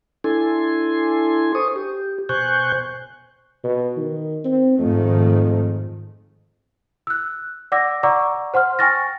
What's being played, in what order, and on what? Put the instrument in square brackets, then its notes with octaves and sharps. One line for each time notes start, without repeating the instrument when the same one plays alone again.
[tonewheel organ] D4 E4 A4 G#5 C6
C5 C#6 D#6
G4
B2 C5 G#5 C#6 F#6 G6
[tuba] B2
D#3
C4
[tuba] F2 [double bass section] G#2 D#3 A3
[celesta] E6 F#6
D5 F#5 D6 E6 A#6
D5 F#5 A#5 C#6 D6 E6
C5 F#5 C6 F6
G5 G#5 C#6 F6 A6 A#6